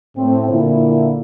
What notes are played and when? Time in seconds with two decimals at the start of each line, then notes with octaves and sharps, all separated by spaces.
0.17 A2 C4
0.49 A#2 D3 E4